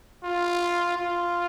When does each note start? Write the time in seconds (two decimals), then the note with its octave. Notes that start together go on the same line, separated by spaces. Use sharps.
0.24 F4
0.98 F4